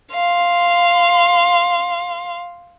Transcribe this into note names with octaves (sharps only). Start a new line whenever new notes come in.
F5 C6